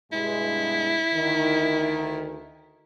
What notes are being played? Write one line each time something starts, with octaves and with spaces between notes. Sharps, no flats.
G2 B2 G#3 E4
D2 D#3